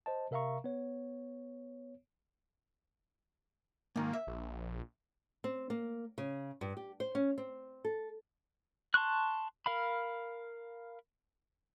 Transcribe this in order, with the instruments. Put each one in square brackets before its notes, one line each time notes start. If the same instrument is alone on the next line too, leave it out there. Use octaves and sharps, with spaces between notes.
[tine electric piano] C5 D#5 A5
C3 A#4 E5 F5 A#5 C#6
B3 C#5
[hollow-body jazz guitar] G#2 D#3 [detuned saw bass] A#3
[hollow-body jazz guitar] E5
[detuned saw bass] A#1
[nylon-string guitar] C4
A#3
C#3
G2
G4
C5
C#4
C4
A4
[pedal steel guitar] A5 C6 C#6 F#6
A#4 F5 B5